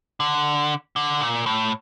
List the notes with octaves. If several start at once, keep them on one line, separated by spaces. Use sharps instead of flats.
D3
D3
A#2
A2